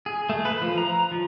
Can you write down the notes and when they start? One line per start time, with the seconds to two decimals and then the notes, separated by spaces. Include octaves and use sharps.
0.06 G#4
0.29 A3
0.45 B4
0.62 F3
0.78 A#5
1.11 F3